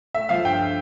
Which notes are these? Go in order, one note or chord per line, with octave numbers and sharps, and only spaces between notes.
A3 E5
F3 F5
G2 G5